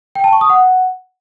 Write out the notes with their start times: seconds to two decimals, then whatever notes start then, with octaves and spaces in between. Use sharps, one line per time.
0.15 G5
0.24 A5
0.33 C#6
0.41 D#6
0.50 F#5